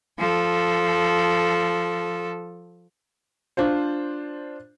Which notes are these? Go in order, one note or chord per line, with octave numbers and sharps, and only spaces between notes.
F3 A4
D4 F4 C5